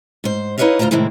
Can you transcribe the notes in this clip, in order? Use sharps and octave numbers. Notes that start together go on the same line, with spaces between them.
G#2 C5
D#4 E4 B4 C#5 D#5 F5
D2 F4 C5 F5 A#5
A2 C3 D#3 G#3 C4 E4